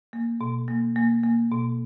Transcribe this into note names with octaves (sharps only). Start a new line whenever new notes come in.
A#3
B2
A#3
A#3
A#3
B2